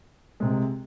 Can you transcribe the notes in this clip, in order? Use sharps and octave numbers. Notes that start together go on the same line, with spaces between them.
C2 C3 G#3